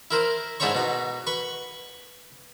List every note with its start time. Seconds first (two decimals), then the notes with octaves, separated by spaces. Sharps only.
0.11 E4 A#4 C5
0.60 G#2 D4 E4 C5 C#5 C#6
0.75 B2 D#4
1.27 B4 C#6